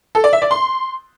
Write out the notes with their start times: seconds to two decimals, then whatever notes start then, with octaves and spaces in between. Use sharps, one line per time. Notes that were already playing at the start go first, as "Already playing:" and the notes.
0.15 A4
0.24 D5
0.33 E5
0.42 D5
0.51 C6